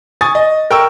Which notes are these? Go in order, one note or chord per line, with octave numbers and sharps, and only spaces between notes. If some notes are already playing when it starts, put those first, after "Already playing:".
G#5 C#6 D#6 A6
D#5
A#4 G5 C#6 E6